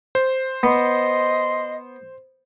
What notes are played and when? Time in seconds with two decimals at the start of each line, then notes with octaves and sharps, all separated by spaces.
0.15 C5
0.63 B3 D#5 C6